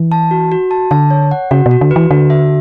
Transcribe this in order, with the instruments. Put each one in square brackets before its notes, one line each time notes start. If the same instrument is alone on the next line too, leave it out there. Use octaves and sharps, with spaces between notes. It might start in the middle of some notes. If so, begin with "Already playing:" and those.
Already playing: [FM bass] E3
[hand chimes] A5
F#4
F#4
A5
[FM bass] D3 [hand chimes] A5
[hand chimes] C#5
F#5
[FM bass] C#3 [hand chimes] F#4
[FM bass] B2
[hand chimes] F#4
[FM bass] D3
[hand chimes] B4
[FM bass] E3
[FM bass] D3 [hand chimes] F#4
[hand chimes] E5